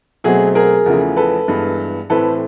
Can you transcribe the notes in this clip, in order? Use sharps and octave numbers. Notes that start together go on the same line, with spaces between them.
B2 F#3 A3 C4 G#4
G#4 A#4
E2 C#3 F3 A3
A4 B4
G2 E3 G#3 B3
A2 E3 A3 C4 A4 B4